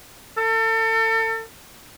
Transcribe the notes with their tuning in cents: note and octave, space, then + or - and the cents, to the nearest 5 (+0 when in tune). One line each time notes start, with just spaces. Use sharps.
A4 +35